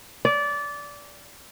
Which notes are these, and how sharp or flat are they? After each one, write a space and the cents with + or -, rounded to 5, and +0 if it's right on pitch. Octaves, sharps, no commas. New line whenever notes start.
D5 -20